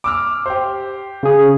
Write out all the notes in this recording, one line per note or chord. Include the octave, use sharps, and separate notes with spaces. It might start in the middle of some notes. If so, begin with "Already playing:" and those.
D6 E6 F6
G4 C5
C#3 G#4